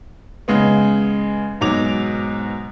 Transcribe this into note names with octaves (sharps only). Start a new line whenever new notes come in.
C#3 G#3 B3
G#2 B2 F#3 D6 F7